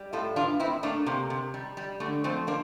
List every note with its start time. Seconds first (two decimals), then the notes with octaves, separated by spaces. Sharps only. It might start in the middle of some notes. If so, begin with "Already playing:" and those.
Already playing: G3
0.13 A2 F4 A4
0.36 E3 D4 F4
0.59 A2 C4 E4
0.83 A3 A#3 D4
1.06 C3 A#3
1.30 C3
1.54 G3
1.77 G3
2.00 D3 A3
2.24 F3 A3 C4
2.47 F3 A#3 D4